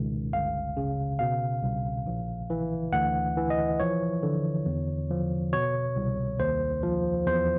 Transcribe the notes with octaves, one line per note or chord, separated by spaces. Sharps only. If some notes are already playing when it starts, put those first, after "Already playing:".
Already playing: C#2 B2 D#3
G1 F5
C#3
B2 F5
C2
A#1
E3
D2 F#5
E3
D#5
F3 C#5
D3
E2
F3
B2 C#5
C2
D#2 C5
F3
E2 C5